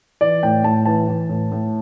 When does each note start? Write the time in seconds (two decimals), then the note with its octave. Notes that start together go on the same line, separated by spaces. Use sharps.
0.21 E3 D5
0.43 A2 G5
0.64 A2 A5
0.85 E3 A5
1.08 E3
1.29 A2
1.52 A2